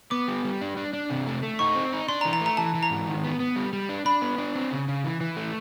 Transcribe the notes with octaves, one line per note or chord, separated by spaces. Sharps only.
B3 D6
G3
G3
D4
D4
D4
C3
A3
A3
D#4 C#6
C4
D#4
D4 C6
A#5
E3
A#5
A3
A#5
E3 A5
E3
A#5
G#2
D#3
B3
B3
G3
G3
D4
D4 B5
B3
D4
C4
C#3
C#3
E3
E3
A3